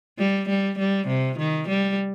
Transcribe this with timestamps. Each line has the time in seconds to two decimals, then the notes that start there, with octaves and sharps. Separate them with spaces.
0.19 G3
0.49 G3
0.78 G3
1.08 C3
1.38 D#3
1.68 G3